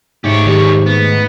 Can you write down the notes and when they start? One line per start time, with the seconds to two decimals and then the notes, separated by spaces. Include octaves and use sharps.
0.24 G#2 A3 G4 C#5
0.46 E2 D#3 G4 C#5
0.86 A3 B3